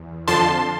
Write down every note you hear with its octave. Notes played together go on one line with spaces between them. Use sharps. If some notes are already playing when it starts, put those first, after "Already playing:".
Already playing: E2
F2 D3 F3 A5 C6